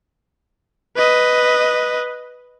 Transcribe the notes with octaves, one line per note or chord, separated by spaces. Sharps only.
B4 D#5